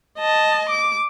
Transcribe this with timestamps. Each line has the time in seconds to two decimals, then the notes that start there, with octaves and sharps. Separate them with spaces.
0.18 D#5 A5
0.69 D6